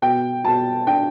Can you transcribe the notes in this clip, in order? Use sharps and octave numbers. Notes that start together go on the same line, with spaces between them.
B2 G5
B2 A5
D4 G5